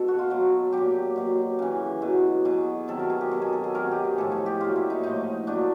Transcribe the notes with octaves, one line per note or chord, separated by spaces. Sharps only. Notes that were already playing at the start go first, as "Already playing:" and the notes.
Already playing: B2 A4
F#4
F4
B2 F#3
A#2 F#3 G4
B2 F#3
C#3 E3
B2 F#3
B2 F#3 G#4
C3 D#3 F#3 A4
A#4
G#4
G4
B2 F#3 A4
G#4
A4
G#4
C3 D#3 F#3 A#4
G4
G#4
A2 F3 A4
G#4
G4
A#2 F#3 F4
E4
D#4
A2 F3 D#4
A#2 F#3 D4